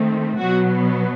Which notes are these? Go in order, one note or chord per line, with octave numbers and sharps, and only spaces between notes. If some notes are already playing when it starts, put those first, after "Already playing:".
Already playing: D#3 A3 C4
B2 F#3 B3 F#4